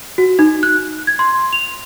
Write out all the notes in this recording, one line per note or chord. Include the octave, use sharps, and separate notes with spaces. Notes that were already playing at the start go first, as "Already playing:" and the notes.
F#4
D#4
F#6
G#6
C6
F7